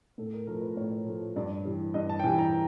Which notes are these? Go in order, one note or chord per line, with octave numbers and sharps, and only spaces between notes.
A2 A4
A#4
F3 A3 A#4
B4
A2 C#5
F3 A3
G2 D5
E3 G3
G2 D#5
A5
G5
E3 G3 G#5
A#5